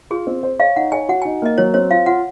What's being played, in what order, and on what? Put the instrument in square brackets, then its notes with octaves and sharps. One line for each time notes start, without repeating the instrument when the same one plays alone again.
[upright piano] F4 [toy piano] G#4
[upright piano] C4
C5
[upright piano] C#5 [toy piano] F5
[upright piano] D#4 [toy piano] F#5
[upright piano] C#5 [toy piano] G#5
[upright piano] F#4 [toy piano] F#5
[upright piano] D#4 [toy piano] G#5
[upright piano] A#3 [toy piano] D#5
[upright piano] F#3 [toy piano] C#5
[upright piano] C4 [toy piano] C#5
[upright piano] F4 [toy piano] F5
[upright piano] F4 [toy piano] F#5